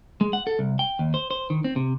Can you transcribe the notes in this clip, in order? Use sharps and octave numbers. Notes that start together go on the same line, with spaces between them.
G#3
F#5
A4
C2
G5
D#2
C5
C5
D#3
C4
C3